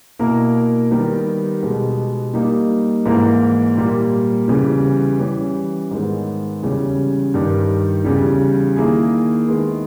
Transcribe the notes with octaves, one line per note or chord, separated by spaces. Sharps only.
B2 A#3 E4 A#4
D#3 G3 B3 G4 A#4
B2 G#3 B3 G4
G3 A#3 D#4
G#2 E3 A#3 E4 A#4
A#2 G3 A#3
E2 C#3 E3 G3
E3 G3 C#4
G#2 D#3 G#3 B3
E2 C#3 G3 C#4
G2 D#3 G3
E2 C#3 G3
D#3 A#3 E4 G#4
D#3 G#3 B3